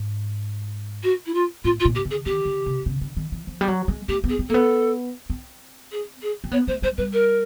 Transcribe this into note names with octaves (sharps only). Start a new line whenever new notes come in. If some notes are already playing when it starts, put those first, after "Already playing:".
Already playing: G#2
F#4
E4
F4
A2 F4
F4
A#2
G4
D3
G#4
D#3 G4
D3
C3
C#3
D3
D#3
E3
F3
G3
F#3
G#3
A3 G4
B3
G#4
C4
A#3 A4
B3
C4
G#4
G#4
C4
B3 C#5
A3 C5
G#3 C5
G3 B4
A#4